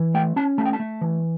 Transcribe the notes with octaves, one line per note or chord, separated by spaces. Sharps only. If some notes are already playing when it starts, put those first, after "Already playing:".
Already playing: E3
A3 G5
C#4 A5
A3 A5
G5
A5
A3
E3